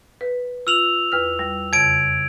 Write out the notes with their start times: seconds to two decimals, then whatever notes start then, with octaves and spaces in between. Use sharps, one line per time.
0.21 B4
0.67 F4 E6 F7 F#7
1.12 E2 B4 F6
1.39 G3
1.73 F2 C#3 G#6 D7